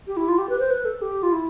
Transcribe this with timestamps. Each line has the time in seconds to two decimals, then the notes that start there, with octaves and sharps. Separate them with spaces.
0.07 G4
0.17 E4
0.28 F4
0.38 G4
0.49 B4
0.59 C5
0.70 B4
0.85 A4
1.02 G4
1.23 F4
1.32 E4